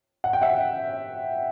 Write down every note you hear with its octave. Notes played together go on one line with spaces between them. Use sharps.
F#5
G5
E5 F#5